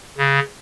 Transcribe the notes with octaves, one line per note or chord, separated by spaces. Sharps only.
C#3